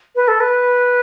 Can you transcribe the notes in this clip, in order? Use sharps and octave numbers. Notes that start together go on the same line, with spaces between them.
B4
A4
B4